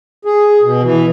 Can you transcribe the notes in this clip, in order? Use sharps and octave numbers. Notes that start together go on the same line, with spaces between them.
G#4
B2
E3